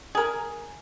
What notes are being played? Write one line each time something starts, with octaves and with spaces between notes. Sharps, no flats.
G#4 A#4